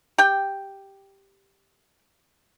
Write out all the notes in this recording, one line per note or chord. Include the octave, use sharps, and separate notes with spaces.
G4 G5